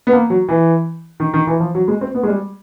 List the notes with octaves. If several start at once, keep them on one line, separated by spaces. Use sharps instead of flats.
B3
A#3
F#3
E3
D#3
D#3
E3
F3
F#3
G#3
C4
B3
G#3
G3